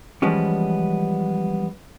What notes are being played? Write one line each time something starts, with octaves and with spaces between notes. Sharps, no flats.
E3 F3 G3 G#3 B3 C#4